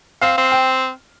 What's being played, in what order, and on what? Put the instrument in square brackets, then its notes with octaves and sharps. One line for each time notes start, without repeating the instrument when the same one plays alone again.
[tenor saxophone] C4 [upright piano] F5
[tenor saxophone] C4
[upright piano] G5